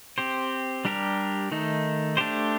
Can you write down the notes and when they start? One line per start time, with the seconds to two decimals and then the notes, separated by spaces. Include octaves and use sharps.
0.18 C4 G4 C5
0.85 G3 D4 G4 A#4
1.52 D#3 A3 D#4
2.17 A3 D4 G4 C5